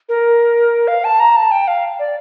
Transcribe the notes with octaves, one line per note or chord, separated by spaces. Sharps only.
A#4
F5
A5
A#5
A5
G5
F5
D5